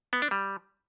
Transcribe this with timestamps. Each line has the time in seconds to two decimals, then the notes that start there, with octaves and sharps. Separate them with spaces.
0.13 B3
0.22 D4
0.31 G3